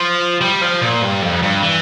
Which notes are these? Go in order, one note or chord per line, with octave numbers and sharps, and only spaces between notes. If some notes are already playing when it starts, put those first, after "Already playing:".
Already playing: F3
G3
F3
A#2
G2
F2
G2
E3